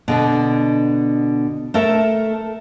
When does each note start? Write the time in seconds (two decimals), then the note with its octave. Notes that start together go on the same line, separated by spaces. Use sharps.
0.08 B2 D3 D4
1.74 A3 A4 A#4 E5